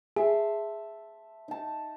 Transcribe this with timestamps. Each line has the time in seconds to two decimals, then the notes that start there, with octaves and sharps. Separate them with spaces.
0.16 G#4 E5 A5 C6
1.48 D#4 A5